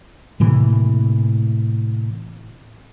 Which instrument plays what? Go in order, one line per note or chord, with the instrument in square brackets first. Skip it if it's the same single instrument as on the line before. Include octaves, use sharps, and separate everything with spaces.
[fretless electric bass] A2 C3 E3 A#3